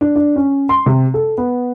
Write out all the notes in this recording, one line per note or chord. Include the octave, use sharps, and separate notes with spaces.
D4
D4
C#4
C6
C3
A4
B3